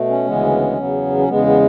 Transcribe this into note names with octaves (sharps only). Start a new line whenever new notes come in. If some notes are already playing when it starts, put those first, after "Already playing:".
Already playing: B2 A3
C#4
D2 C#3 E3 G#3 B3
E2 C#3 F#3 B3
C#4
E2 C#3 G#3 B3
B3